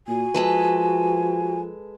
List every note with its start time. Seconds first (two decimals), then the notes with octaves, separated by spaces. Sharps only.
0.08 A#2 F#4 G#5
0.34 F3 G#3 A4 B4